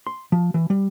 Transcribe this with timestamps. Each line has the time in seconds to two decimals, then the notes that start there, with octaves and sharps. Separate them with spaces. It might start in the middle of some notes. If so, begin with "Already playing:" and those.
0.07 C6
0.32 F3
0.54 E3
0.70 G3